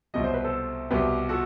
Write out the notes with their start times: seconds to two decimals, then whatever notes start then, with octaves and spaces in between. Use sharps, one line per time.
0.14 C2 B2 F#3 D#5
0.24 C5
0.34 B4
0.44 A4 C5
0.90 C2 B2 F#3 G4 B4
1.29 F#4 A4